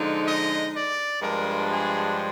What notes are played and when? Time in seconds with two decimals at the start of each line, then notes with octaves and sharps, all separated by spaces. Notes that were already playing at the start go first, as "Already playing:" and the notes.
Already playing: D3 F3 G#3 D#4
0.26 D#5
0.74 D5
1.22 G2 F3 G#3 D4 A#4
1.69 G#4